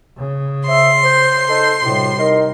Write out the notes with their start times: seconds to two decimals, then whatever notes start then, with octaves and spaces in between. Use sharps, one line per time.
0.18 C#3
0.67 C5 E5 C6
1.02 C5
1.49 D#4 A4 C5
1.82 D2 A2 C3 G3
2.18 D#4 A#4